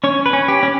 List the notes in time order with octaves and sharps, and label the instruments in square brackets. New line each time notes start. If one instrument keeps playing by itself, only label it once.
[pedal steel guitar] C#4 C#5
B4
C#4
G4
C#4